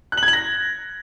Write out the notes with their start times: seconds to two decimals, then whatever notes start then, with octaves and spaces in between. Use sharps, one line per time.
0.12 F#6
0.17 F#7
0.23 G#6
0.28 F#7
0.33 A#6